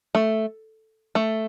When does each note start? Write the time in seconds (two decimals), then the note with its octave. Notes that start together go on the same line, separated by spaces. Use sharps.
0.15 A3
1.15 A3